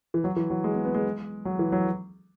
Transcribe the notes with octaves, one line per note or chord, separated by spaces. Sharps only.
E3
F#3
E3
F#3
G#3
B3
B3
G#3
F#3
E3
F#3